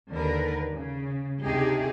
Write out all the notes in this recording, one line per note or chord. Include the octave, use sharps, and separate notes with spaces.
D#2 D3 A#4 B4
C#3
D2 C3 A3 D#4 G4 G#4